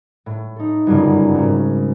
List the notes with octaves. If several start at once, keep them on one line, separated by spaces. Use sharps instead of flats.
A2
D#4 A4
G1 F#2 C#3
G#1